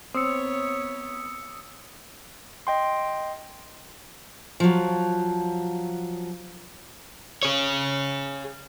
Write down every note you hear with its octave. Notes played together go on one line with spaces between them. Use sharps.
B3 C4 C#5 D#6 E6 C#7
D#5 G5 C6
F3 F#3
G#4 C#5